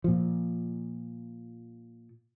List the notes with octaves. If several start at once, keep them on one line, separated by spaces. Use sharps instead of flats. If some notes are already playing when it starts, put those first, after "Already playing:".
A#2 F3